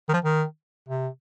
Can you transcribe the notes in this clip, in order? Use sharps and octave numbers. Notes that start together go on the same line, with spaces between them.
D#3
F3
D#3
C3